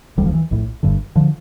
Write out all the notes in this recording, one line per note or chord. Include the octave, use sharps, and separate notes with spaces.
E1 D2 D3 G3
F3
E3
A#1 A2
G1 G2 D3
D3 F3